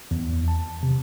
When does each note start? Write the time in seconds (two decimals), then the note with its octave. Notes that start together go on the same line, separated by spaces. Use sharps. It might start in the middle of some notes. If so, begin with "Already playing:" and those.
0.11 E2
0.48 A5
0.83 C3